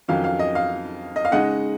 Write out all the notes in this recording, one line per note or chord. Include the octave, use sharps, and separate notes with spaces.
F2 D#3 F#3 C#4 F5
F5
D#5
F5
D#5
F5
C#3 G#3 D#4 D#5 F#5